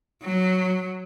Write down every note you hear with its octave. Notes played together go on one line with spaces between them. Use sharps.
F#3